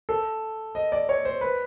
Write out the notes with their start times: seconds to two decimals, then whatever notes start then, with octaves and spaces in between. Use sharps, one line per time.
0.09 A4
0.75 D#5
0.92 D5
1.09 C#5
1.25 C5
1.41 B4